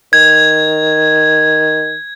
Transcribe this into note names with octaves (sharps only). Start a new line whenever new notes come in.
D#3 G#6